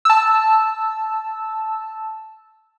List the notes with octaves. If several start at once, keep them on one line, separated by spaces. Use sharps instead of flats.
A5 E6